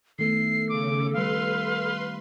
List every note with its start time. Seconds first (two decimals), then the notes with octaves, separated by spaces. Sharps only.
0.19 D#3 A3 B3 A4 C7
0.69 C#3 D6
1.13 D#3 G3 B4 F5 C6